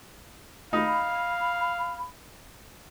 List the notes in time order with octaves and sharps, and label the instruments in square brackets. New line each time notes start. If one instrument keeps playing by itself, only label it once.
[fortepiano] D#4 [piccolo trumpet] F5 [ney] B5